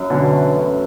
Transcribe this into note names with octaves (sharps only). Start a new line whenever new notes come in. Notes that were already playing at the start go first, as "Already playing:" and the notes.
Already playing: F#2
B2 D3 E3
A3
F#2